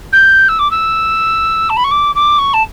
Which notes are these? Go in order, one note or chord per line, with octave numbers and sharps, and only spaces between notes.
G6
E6
D6
E6
A5
B5
C#6
D6
D6
C#6
A5